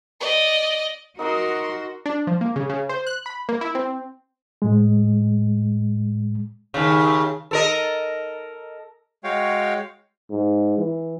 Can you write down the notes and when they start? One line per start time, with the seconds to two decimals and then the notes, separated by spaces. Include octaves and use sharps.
0.20 D5 D#5
1.19 D#4 F#4 A#4 C6 D6 D#6
2.06 D4
2.27 F3
2.41 A#3
2.56 C#3
2.70 C#3
2.89 C5
3.07 F#6
3.26 B5
3.49 A#3
3.61 E4
3.75 C4
4.62 A2 G#3
6.74 D#2 C#3
7.51 A4 A#4 D#5
9.24 G#3 F#4 C#5 F5 G5
10.30 G#2
10.78 E3